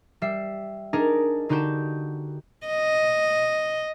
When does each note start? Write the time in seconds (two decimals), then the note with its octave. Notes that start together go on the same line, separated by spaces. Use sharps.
0.22 G3 E5 C7
0.93 D4 D#4 G#4 A#4
1.49 D3 D#4 F#4 G4 G6 E7
2.67 D#5